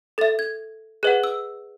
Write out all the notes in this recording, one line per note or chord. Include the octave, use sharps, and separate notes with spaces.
A4 E5 A6
G#6
G#4 B4 D#5 F#5 F#6
E6